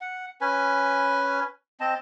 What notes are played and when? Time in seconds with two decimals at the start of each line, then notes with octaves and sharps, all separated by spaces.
0.01 F#5
0.41 C#4 B4 G#5
1.80 C4 D#5 A5